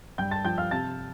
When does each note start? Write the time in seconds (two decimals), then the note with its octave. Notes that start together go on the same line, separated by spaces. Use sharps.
0.18 G2 G5 G6
0.31 A5 A6
0.45 F3 G5 G6
0.58 F5 F6
0.71 C3 A5 A6